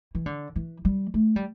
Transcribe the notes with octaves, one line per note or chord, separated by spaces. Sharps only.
E3
D3
E3
G3
A3
G3